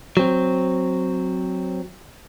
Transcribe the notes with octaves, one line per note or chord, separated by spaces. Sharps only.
F#3 C4